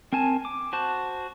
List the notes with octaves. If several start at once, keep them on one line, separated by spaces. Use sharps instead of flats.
C4 A#4 G#5 A5
D6
F#4 C5 A5